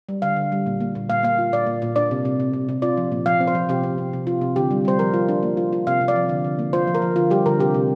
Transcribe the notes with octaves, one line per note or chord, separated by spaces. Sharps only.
G3
D3 F5
D3
G3
A#2
A#3
A#2
A#2 F5
A#3 F5
F4
A#2 D5
A#2
A#2
D4 D5
C3
C3
C3
C3
C3
F4 D5
F3
A#2
F3 F5
C4
C5
F3
C3 G4
C4
C3
C3
F4
C3
D3 G4
G3
G3 C5
F3 A#4
F4
D4
A#3
F4
F4
C3 F5
C3
D5
F3
D3
D3
A#3
F4 C5
F3
A#4
F3
D3 F4
G3 G4
D3 A#4
C3 G4
C3